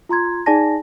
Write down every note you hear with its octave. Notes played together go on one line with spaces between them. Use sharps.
F4 A#5 C6 G#6
D#4 G#4 D5 G#5 A5 A#6